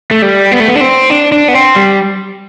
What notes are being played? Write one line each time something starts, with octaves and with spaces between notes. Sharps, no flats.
A3
G3
B3
A3
B3
D4
C4
D4
D4
B3
C4
G3